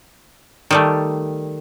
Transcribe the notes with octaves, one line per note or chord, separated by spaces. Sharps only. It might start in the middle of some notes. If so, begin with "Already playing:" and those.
D#3 G3 A3